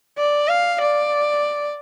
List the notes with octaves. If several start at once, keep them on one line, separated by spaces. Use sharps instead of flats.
D5
F5
D5